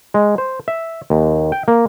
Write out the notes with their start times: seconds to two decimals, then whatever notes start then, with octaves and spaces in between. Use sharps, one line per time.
0.14 G#3
0.38 C5
0.68 E5
1.10 D#2
1.52 G5
1.68 A#3